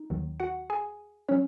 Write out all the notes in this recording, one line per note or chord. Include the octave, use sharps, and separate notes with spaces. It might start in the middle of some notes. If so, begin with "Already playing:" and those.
Already playing: D#4
D#2 D#3 F#3
F#4 F#5
G#4 G#5
F#3 C#4 C#5